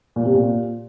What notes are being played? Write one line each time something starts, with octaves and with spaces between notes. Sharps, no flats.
A#2
C3
A#2